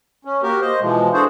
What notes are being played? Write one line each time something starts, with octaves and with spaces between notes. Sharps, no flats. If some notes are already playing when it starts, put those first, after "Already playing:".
C#4
A#3 F#4 G4 A#4
C5 D#5
B2 E3 F3 G#3
D4 F#4 G#4 A4 C5